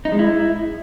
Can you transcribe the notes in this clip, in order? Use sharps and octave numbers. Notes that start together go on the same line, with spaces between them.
D#4
G#3
E4